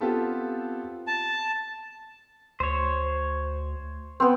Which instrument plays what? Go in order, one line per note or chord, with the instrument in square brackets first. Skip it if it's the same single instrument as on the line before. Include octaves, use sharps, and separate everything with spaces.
[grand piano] B3 C4 F4 G4 A4 A5
[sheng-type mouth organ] A5
[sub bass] D2 [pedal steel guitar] C5 C#5
[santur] B3 C4